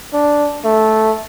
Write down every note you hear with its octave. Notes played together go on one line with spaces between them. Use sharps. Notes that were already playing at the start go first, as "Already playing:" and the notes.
D4
A3